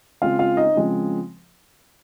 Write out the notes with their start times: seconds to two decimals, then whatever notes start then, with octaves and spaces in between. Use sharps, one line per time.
0.22 C#3 G#3 C4 F4 F5
0.39 F4 F5
0.57 D#4 D#5
0.75 C#3 F3 G#3 C4